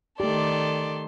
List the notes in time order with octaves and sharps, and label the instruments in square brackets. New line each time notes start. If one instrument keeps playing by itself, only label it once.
[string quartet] D#3 A4 C6 [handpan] A3 G4 [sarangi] D5